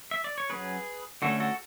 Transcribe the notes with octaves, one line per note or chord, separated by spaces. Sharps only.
E5
D5
C#5
F#3 C#4 G#4 B4
D3 A3 C#4 F#4 A4
F#4 A4